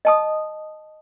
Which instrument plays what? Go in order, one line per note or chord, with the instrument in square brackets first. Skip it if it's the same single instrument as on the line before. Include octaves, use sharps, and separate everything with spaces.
[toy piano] D#5 A5 D#6